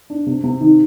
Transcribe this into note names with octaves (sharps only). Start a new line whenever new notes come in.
D4
C3
C3
D#3